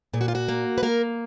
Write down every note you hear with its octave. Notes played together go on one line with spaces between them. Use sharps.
A#2 G#4
F#4
F4
F#4
A#3
B4
A#3 A#4